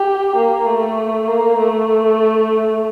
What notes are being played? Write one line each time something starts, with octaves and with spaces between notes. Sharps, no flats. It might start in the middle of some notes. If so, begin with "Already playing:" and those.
Already playing: G4
A#3
A3
A#3
A3